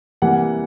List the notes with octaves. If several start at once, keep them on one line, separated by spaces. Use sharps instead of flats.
C3 E3 G3 A#3 F#5